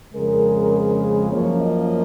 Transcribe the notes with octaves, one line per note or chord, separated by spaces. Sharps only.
F2 C#3 G#3 A#4
F#2 F3 A#3 C#4 C#5
D#5